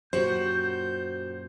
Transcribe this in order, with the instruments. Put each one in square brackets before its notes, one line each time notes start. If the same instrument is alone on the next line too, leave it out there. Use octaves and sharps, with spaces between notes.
[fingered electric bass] F#2 A#2 [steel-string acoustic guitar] F#4 G4 F#5 [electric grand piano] C5 [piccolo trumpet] G6